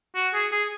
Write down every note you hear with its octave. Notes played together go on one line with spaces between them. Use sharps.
F#4
G#4
G#4